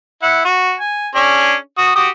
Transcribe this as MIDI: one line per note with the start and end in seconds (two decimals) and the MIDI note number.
0.22 0.41 64
0.22 0.41 78
0.45 0.75 66
0.80 1.09 80
1.15 1.55 61
1.15 1.55 62
1.15 1.55 68
1.78 1.95 66
1.78 1.95 87
1.96 2.09 66
1.96 2.09 67
1.96 2.09 87